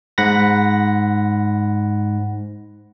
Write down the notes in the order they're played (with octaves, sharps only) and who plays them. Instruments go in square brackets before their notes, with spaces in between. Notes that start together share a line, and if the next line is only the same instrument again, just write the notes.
[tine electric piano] G#2 F#5 B5 A#6